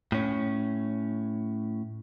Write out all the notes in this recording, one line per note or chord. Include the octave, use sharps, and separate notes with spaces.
A2 C#4